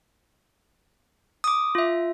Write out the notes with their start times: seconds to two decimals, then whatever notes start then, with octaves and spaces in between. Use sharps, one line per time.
1.44 D6 D#6
1.75 F4 E5